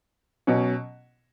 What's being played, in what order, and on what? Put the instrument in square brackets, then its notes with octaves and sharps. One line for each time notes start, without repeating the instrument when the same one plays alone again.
[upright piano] B2 F#3 C#4